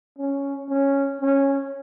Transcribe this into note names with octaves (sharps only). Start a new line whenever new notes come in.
C#4
C#4
C#4